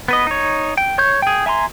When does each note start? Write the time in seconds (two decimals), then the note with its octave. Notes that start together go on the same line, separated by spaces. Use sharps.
0.08 B3 B4 D#5
0.27 D#4 C#5
0.77 G5
0.98 C#5 C#6 G6
1.22 G#4 G5
1.46 E5 G#5 A#5 C6